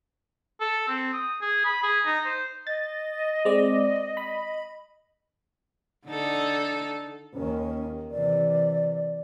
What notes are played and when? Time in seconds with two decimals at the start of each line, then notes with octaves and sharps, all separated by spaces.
0.61 A4
0.88 C4
1.13 D#6
1.41 G#4
1.65 B5
1.83 G#4
2.05 D#4
2.25 C5
2.67 D#5 A6
3.45 G#3 C4 D5
4.17 B5
6.07 D3 D#4 A4
7.34 D#2 D#3 C#4
8.11 C3 E3 D5